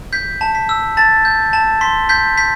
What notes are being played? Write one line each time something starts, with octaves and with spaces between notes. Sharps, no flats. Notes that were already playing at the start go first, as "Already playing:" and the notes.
G6 B6
A5
B6
E6
A5 A6
G6
A5
C6 B6
G6 B6
G6 B6